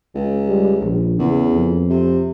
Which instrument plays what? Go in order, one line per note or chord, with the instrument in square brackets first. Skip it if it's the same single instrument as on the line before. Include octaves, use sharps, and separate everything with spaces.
[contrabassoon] C#2
[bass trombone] G3
A#1
[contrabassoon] E2 [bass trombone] C#3
[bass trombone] F2
[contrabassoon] C3